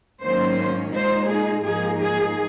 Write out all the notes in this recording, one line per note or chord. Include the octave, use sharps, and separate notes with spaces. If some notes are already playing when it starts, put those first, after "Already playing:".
G#2 D#3 F#3 A#3 C#4 C5
A#2 G#3 D#4 C5
G#4
G#2 F3 A#3 D#4 G#4
G#4